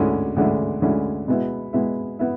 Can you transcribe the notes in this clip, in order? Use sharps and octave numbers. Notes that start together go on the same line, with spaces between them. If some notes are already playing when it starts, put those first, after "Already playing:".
Already playing: D2 D3 G#3 C#4 E4
D2 D3 G#3 C#4 E4
D2 D3 G#3 C#4 E4
B2 G#3 B3 E4
B2 G#3 B3 E4
B3 E4